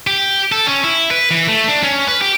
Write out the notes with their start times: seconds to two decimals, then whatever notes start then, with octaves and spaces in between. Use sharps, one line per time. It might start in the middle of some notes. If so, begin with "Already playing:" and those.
0.07 G4
0.52 A4
0.67 C#4
0.84 E4
1.11 B4
1.31 E3
1.48 A3
1.68 D4
1.83 C#4
2.07 B4
2.22 G4